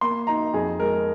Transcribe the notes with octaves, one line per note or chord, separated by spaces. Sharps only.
A#3 C6
D#4 A#5
F2 G#4
G#3 A#4